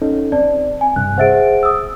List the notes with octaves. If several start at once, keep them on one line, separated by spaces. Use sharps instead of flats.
C#4 D#4 A4
C4 D5 A5
G#5
G2 C3 F#6
G#4 C5 E5 F#5 A6 D7
D#6 E6